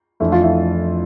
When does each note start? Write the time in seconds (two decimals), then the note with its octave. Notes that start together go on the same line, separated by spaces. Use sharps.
0.20 F2 E3 A3 D4 E4 A4
0.32 F4
0.43 E4